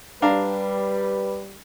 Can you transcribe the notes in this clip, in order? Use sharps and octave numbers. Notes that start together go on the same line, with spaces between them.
G3 D4 B4 F5 A#5